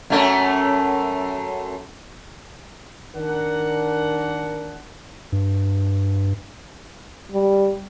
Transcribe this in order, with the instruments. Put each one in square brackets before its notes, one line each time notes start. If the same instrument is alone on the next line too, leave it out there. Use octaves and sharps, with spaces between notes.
[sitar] F#2 A3 C#4
[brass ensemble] D#3 D4 A#4 F#5
[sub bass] G2
[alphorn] G3